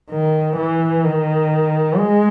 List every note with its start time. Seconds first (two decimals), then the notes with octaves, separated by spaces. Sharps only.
0.11 D#3
0.57 E3
1.04 D#3
1.97 G#3